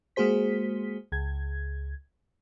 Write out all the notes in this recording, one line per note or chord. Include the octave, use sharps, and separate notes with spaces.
G#3 A#3 F#4 G#4 C5 B6
C#2 G#6